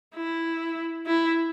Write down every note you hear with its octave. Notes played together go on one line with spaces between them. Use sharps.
E4
E4